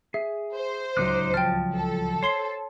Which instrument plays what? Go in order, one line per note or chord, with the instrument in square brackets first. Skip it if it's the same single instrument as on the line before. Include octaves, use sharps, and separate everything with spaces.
[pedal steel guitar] G#4 [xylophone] E5
[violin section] C5
[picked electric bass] D1 C#2 F#3 [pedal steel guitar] D#4 D6 F#6
[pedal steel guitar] F3 A5 [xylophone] G5 F6
[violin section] A4
[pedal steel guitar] C5 [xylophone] C#5 C6 C7